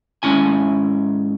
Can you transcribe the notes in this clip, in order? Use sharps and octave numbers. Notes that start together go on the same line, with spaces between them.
G#2 C#4 E4 G#5